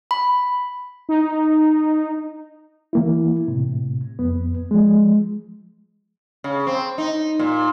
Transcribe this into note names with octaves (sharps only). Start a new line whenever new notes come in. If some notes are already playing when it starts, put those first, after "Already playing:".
B5
D#4
E3 A#3 E4
A2 C3
F2 B3
F3 G#3
C#3
C4
D#4
A#2